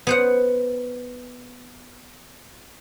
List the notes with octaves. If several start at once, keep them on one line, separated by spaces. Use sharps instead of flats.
B3 C5 F#5